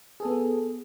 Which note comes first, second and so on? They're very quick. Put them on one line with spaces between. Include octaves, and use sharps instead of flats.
G#4 A4 B3